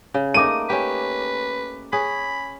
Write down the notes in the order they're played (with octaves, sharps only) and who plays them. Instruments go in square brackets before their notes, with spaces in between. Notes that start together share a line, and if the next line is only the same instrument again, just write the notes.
[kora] C#3
[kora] A3 A#3 D#4 [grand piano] D6 D#7
[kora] C#4 G4 [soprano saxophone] B4
[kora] C#4 G#4 [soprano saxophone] B5